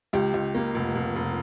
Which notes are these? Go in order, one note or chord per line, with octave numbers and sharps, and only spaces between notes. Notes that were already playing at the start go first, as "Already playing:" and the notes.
C#2 G4
C#2
A#3
F1
F1
F1